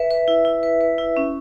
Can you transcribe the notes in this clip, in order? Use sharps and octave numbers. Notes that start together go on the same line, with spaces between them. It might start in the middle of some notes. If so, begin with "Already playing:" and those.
Already playing: B4 E5
B4
E4
E4
B4
B4
E4
C#4